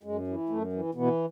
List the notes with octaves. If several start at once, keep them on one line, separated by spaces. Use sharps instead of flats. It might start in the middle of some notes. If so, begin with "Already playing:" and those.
F#2 G#3
E3
F#2 A3
E3
B2 E3 B3